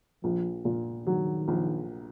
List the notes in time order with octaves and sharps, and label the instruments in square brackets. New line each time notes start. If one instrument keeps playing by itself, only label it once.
[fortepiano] A#1 [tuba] F3
[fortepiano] A#2
[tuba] D#3 [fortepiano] F#3
[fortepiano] A#1